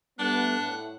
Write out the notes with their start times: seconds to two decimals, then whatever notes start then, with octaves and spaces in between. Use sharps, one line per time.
0.19 G3 A3 B3 D4 F#5
0.60 A2